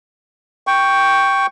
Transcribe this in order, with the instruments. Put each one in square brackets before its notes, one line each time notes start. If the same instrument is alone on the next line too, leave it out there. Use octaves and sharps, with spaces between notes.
[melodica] G5 C#6